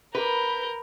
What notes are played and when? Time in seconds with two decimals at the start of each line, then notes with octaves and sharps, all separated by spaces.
0.15 A#4 B4 G6